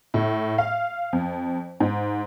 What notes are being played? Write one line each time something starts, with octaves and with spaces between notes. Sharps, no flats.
A2
F5
F2
G#2